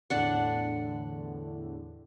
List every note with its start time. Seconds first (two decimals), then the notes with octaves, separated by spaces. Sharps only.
0.10 E2 A2 D3 D4 F#5